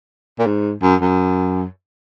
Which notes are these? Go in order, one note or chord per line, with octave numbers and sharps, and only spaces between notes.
A#2
G#2
F#2
F#2